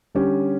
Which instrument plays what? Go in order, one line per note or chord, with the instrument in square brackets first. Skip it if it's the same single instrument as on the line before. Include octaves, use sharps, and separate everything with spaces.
[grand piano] D3 G3 C#4 G4